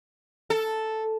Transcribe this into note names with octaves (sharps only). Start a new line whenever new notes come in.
A4